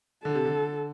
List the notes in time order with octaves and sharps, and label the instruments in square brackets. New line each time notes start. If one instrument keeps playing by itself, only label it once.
[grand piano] D3 [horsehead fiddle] A4
[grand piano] C3
D3